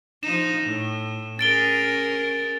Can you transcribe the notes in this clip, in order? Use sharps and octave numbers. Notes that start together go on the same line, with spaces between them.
F3 D#4 E7
A2
C#4 G#4 A#4 A6 D7 G7